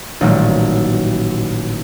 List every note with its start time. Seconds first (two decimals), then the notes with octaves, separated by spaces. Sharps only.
0.21 A1 A#2 D#3 F#3 G3